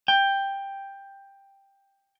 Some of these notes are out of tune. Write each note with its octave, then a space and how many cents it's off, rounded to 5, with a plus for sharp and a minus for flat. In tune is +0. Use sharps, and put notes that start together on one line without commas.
G5 +10